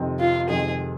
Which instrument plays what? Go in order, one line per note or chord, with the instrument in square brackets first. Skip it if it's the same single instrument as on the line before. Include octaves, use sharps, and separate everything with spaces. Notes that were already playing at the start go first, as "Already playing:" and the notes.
Already playing: [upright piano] F2 C3 D#3 G#3 C4
[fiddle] F4
[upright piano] F2 C3 D#3 G#3 C4 [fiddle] G#4